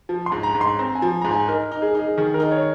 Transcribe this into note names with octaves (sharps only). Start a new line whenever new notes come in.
F3
C6
G#2
A#5
G#2
C6
C4 A#5
G#5
F3
G#2 A#5
G#5
D#4 A#4
D#4
G#4
D#4 G#4
D#3 G#4
A#4
D#4
C#5